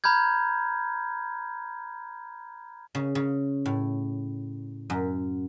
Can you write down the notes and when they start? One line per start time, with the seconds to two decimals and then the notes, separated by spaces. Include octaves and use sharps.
0.04 A#5 B5 F6 G6 G#6
2.95 C#3
3.15 C#3
3.66 A2
4.90 F#2